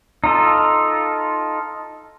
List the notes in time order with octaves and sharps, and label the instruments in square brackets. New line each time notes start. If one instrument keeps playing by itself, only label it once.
[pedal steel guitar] D#4 F4 A4